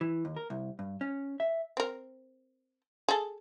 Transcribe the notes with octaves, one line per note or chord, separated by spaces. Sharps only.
E3
D#2
A#4
C2
G2
C#4
E5
C4 A#4
G#4 A4